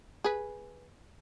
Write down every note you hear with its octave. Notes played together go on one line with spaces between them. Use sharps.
G#4 B4